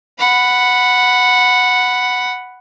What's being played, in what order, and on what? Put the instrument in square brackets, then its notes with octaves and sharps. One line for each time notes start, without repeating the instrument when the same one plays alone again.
[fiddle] F#5 B5